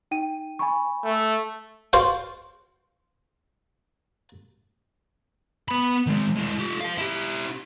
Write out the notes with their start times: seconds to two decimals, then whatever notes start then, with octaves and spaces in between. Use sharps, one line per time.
0.11 D#4 G5 D#7
0.59 G#5 B5 C#6
1.04 A3
1.93 F4 F#4 C5
5.69 B3 B5
6.07 D#3 G#3
6.36 G#3 E4
6.59 F4 G4
6.80 C5 F5
6.98 E4 G4